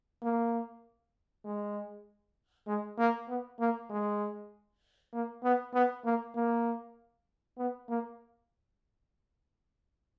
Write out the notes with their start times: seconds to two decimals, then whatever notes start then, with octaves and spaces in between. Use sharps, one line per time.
0.22 A#3
1.45 G#3
2.67 G#3
2.98 A#3
3.28 B3
3.59 A#3
3.90 G#3
5.13 A#3
5.43 B3
5.74 B3
6.05 A#3
6.35 A#3
7.58 B3
7.88 A#3